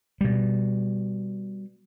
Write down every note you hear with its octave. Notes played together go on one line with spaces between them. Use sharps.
B2 G3